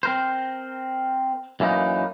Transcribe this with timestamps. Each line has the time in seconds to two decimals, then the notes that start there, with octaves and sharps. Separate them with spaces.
0.03 C4 A#4 C5
1.60 F#2 E3 A#3 C4 D#4